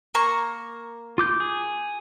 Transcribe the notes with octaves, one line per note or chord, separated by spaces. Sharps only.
A#3 A#5 C#6
F4 D6 G6
G#4